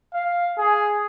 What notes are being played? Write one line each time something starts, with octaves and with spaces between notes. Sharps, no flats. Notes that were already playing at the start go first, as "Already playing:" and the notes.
F5
G#4